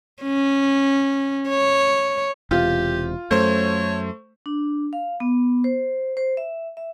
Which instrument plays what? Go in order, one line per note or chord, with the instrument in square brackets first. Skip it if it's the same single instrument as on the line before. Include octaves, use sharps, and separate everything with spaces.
[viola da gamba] C#4
C#5
[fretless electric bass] E1 E2 C3 [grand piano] F4 [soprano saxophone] G4
[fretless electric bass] F#2 [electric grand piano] A3 C5 [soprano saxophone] C#5
[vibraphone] D4
F5
B3
C5
C5
E5
E5